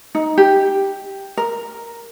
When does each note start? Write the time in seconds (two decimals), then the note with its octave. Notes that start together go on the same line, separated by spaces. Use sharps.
0.15 D#4
0.38 G4
1.37 A#4